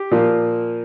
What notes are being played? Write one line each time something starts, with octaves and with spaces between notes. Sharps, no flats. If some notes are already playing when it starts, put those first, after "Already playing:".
Already playing: G4
A#2 F3 A#3